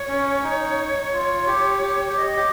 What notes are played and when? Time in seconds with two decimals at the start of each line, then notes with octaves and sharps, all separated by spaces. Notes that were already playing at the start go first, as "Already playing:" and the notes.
Already playing: C#5
0.08 C#4
0.44 D#4
1.14 F4
1.47 G4
1.82 G4
2.09 G4
2.17 D#5
2.37 G4